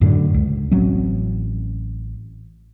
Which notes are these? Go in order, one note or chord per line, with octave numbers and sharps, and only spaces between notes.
F#2 A2 D3
C#2
A1 F#3 C4 C#4